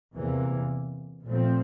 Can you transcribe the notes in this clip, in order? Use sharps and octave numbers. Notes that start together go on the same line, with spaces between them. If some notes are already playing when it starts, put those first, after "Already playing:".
E2 C3 E3 A#3
A#2 F3 A3 C4